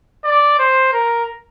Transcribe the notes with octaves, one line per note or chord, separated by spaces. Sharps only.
D5
C5
A#4